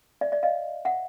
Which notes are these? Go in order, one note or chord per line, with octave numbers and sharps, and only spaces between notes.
D5 E5
D5 E5
D#5 F5
E5 F#5